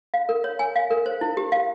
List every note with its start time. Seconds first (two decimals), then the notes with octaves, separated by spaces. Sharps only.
0.14 F5
0.29 A#4
0.44 C#5
0.59 G#5
0.76 F5
0.91 A#4
1.06 C5
1.21 E4
1.37 G4
1.52 F5